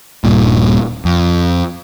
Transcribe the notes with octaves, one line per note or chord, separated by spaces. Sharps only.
D#1 G2 A#2
F2